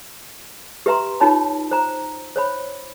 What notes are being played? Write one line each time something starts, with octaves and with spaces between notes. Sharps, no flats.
G4 B4 E5 A#5 C6
D#4 F4 C#5 A5 B5
C5 A#5
C5 C#5 B5